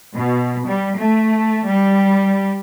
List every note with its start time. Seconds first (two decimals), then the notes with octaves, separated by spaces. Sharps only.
0.14 B2
0.64 G3
0.96 A3
1.66 G3